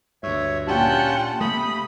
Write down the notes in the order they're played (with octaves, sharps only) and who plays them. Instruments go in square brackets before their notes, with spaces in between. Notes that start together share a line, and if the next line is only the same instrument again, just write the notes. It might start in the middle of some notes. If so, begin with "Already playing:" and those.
[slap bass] D2 G2 [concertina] C#5 E5
[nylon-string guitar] A#2 D4 G4 [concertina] C#4 F4 A5 [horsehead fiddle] F#5 G5
[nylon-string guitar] C3 [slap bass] A3 A#3 [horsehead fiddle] B5 [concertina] D#6